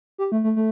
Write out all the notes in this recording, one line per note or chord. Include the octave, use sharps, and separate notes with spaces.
G4
A3
A3
A3